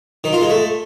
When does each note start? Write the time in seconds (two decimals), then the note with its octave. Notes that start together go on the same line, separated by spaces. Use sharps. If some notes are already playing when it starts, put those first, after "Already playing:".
0.24 D#3
0.33 F4
0.41 G#3
0.50 A3